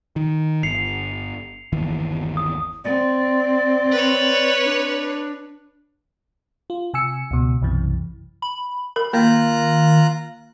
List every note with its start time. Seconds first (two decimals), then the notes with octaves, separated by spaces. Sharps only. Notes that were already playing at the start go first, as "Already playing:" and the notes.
0.16 D#3
0.63 G1 C7 C#7 F7
1.73 G1 D#2 E3
2.37 D#6
2.84 C4 D5
3.91 B4 C#5
4.65 D4
6.70 F4
6.94 C3 G#5 E6 C#7
7.31 C#2 B2
7.62 B1 F#2 C3 E3
8.42 B5
8.96 A#4 B5
9.13 D#3 A#3 F4 A#5 F#6